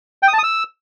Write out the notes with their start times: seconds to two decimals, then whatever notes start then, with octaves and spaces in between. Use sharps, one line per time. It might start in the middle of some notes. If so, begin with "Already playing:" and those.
0.23 G5
0.28 D#6
0.33 A5
0.38 D#6
0.44 E6